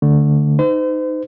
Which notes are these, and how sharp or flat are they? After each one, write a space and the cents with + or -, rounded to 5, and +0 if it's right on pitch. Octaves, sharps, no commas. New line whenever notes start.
D3 +0 A3 +0
D#4 -5 C5 -40